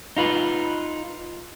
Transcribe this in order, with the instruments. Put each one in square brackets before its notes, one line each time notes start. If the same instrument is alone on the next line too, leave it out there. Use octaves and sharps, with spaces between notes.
[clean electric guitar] D#4 F4 B4